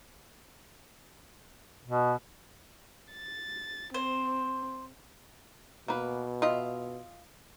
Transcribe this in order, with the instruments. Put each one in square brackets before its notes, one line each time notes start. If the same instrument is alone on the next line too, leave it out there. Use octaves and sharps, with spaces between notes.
[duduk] B2
[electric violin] A6
[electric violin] C4 [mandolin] C5
[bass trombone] B2 [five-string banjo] A#3 B4
[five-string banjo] F4 D#5 E5